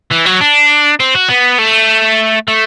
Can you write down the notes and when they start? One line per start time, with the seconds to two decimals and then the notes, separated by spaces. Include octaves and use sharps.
0.12 E3
0.26 F#3
0.41 D4
1.00 C4
1.15 F#4
1.29 B3
1.59 A3
2.48 A3